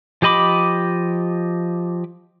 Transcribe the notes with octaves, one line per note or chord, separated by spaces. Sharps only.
F3 G4 D#5 B5 D6